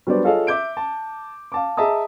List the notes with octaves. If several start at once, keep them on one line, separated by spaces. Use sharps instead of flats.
F#3 G3 B3 D4 C5 D5
F4 G#4 A4 C#5 D#5 F5
E5 D6 G6 D7
A5
F5 A5 D6
G#4 D#5 E5 A5 A#5 D#6